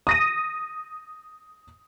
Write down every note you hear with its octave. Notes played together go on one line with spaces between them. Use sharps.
D#6 A#6 D#7